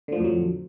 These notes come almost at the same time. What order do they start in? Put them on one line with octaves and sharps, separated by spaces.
D3 F3 A2 F2 F#3